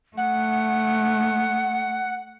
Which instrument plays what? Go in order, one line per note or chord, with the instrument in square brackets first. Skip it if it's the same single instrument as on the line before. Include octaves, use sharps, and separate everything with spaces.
[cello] A3 [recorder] F#5